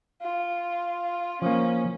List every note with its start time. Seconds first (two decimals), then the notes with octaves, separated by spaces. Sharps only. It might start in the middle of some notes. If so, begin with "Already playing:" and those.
0.22 F4
1.42 F3 A#3 C#4